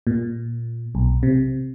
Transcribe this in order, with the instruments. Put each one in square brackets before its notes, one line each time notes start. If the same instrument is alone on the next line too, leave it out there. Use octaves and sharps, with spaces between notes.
[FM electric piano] A#2
B1
C3